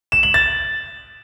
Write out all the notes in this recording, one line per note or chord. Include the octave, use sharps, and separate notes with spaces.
E7
F#7
A6